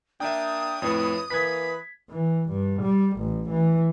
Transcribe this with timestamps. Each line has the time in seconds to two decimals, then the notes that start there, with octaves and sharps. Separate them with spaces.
0.20 A#3 D4 E5 G5 D#6
0.82 F2 A2 E4 B4 C#5
1.30 E3 A#3 B4 G#6 B6
2.10 E3
2.49 G2
2.82 G3
3.17 A1
3.50 E3